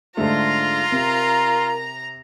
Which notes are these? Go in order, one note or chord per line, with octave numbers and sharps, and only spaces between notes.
G#2 D3 A3 F4 A#5
C3 A#4